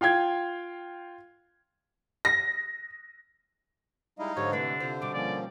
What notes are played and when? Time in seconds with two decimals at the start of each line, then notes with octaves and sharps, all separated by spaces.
0.01 F4 F5 G5 G#6
2.25 A#6
4.19 G3 G#3 D#4 E4 D#5 F5
4.37 G#2 D3 F3 G4 C#5
4.53 C3 E3 A3 D4 B4
4.80 C3 E4 F4 C5
5.02 B2 G3 D6
5.14 F3 A#3 C#4 D5